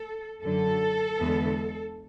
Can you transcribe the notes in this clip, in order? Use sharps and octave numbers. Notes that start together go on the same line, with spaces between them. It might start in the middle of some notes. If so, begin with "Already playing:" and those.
Already playing: A4
F#2 D3 F#3 A4
E2 D3 G#3 B3